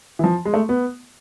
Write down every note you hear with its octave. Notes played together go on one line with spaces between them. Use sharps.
E3
F3
G#3
A3
B3